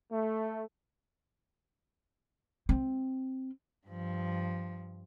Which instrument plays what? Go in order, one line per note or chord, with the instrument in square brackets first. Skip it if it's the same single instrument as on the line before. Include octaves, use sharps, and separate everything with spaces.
[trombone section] A3
[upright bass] C4
[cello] G2 F3